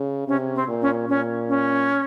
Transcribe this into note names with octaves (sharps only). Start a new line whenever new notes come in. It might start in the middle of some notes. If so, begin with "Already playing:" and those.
Already playing: C#3
C3 C#4
C4
A#2
C#4
A#2 C#4
C#4